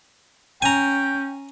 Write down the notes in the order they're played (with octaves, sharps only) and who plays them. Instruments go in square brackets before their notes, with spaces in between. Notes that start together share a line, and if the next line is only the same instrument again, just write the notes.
[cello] C#4 [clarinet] G5 [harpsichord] G#5 A#5